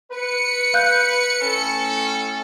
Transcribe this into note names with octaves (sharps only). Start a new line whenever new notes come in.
B4 C#7
F5 F#6 G6
A2 C#4 A4